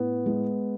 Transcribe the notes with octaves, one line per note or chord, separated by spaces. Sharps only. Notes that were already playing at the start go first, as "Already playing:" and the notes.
Already playing: A2 B3
G#3